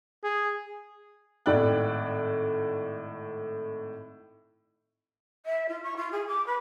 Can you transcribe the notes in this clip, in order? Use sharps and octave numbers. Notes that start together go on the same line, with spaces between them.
G#4
G#1 A2 D5 G5 F#6
E5
F4
C#6
F4
G#4
D6
B4